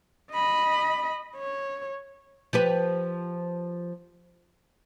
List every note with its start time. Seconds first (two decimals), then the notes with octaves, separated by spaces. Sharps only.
0.32 D#5 B5
1.37 C#5
2.53 F3 G4 B4